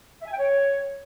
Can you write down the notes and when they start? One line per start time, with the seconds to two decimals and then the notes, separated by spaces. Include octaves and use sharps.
0.21 E5
0.27 G#5
0.33 G5
0.38 C#5